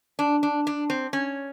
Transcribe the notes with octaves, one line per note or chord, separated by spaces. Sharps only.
D4
D4
D4
C4
C#4